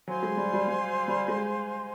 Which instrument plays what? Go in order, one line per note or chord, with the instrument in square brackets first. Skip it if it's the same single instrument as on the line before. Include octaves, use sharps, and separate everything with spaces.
[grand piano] F#3 [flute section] C5 F5 G#5 C6
[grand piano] G#3
G3
G3
G3
G3
G#3